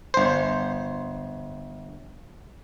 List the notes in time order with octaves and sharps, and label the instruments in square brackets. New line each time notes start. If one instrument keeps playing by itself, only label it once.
[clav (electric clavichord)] G1 C5